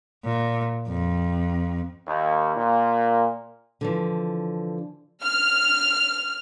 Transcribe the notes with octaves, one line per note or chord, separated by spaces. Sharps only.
A#2
F2
D#2
A#2
D3 E3 F3
F6